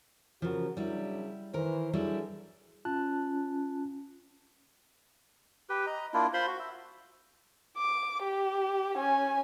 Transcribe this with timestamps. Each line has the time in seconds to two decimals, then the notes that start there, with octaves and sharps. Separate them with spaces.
0.42 C#3 F3 F#4 A#4
0.77 C#3 F#3 G3 D4 E4
1.53 D#3 E3 A#4 C5
1.93 D3 F#3 G3 D4 E4 G#4
2.85 C#4 F4 A5 F#6
5.69 G4 B4
5.86 D#5 A#5
6.14 A#3 D4 E4 F4
6.34 F4 C5 B5 C6
6.47 F#4
6.59 E5
7.78 D6
8.23 G4
8.97 C#4 G#5